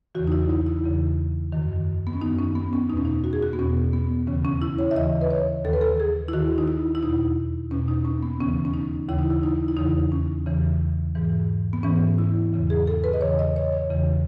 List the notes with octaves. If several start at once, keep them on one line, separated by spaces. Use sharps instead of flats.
E2 C#3 E3 F#4
D#4
E4
D#4
E4
E2 C#3 E3
F#2 D#3
B3
C#4
F#2 D#3 D#4
C#4
B3
C#4
E2 B2 C#4 D#4
D#4
F#4
G#4
F#4
B3
E2 B2 C#4
B3
D#2 C#3 E3 C#4
C#4
E4
C#5
E5
D#2 C#3 E3 D#5
B4
C#5
D#2 D#3 A4
B4
A4
G#4
E4
D#2 D#3 F#4
D#4
E4
E4
E2 B2 D#4
E2 B2 C#4
D#4
C#4
B3
D#2 C#3 E3 C#4
C#4
D#4
D#2 C#3 E3 E4
D#4
E4
D#4
E4
E2 C#3 E3 D#4
C#4
E2 C#3 E3
G#2 E3
B3
G#2 E3 C#4
E4
E2 C#3 E3
G#4
A4
B4
D#5
E2 C#3 E3 C#5
D#5
C#5
C#5
E2 C#3 E3